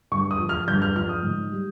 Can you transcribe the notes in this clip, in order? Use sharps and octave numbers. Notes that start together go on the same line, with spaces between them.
G2 C#6
D#6
F3
F6
G2 G6
F6
F3 F6
D#6
G#2
G3